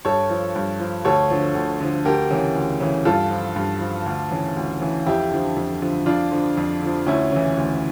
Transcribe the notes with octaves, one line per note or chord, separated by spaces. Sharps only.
G2 A4 C#5
F3
G2
F3
D2 A4 C#5
D3 F3
D2
D3 F3
D2 G4 A#4
C#3 E3
D2
C#3 E3
G2 F4 A4
F3
G2
F3
D2
C#3 E3
D2
C#3 E3
F2 E4 G4
D3 F3
F2
D3 F3
F2 D4 F4
D3 F3
F2
D3 F3
D2 C#4 E4
C#3 E3
D2